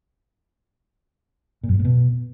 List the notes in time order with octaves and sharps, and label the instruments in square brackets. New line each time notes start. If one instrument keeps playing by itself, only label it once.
[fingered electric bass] A#2
F#2
G#2
A2
B2